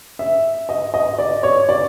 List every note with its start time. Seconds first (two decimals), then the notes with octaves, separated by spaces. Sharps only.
0.19 E5
0.69 D#5
0.94 D#5
1.19 D5
1.43 C#5
1.69 D5